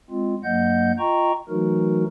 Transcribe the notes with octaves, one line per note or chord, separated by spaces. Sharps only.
G#3 C4 F4
G2 F#3 A#3 D#5 F#5 G6
F4 D#5 G5 A#5 C#6
E3 F#3 A3 D#4 F#4 A#4